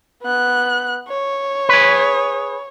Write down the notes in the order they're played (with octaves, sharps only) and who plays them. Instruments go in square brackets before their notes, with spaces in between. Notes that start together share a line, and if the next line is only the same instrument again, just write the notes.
[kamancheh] B3 F#6
C#5
[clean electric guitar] G#4 B4